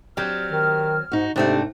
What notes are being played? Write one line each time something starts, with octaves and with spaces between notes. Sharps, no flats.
F#3 C4 G4 D5 F6
D#3
G#2 D#4 F#4
G#2 C3 A3 C4 D4